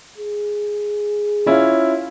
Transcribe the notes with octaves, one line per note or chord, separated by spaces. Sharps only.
G#4
C#4 E4 F4